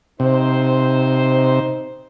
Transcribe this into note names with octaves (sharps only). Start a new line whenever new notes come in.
C3 D#4 C5